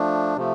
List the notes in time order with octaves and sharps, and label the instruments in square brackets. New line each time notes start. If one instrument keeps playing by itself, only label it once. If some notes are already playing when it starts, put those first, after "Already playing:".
Already playing: [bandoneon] F3 A3 D4
C3 F3 A3